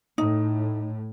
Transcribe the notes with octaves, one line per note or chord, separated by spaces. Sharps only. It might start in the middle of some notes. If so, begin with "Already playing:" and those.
A2 D#4